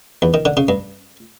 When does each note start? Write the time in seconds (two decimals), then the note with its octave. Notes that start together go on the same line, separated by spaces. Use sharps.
0.22 E2
0.34 D#3
0.45 D3
0.57 C#3
0.68 G2